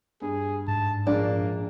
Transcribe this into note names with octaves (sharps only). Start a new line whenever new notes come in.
G2 G#4
G#2 A5
A#1 G#3 A#3 D4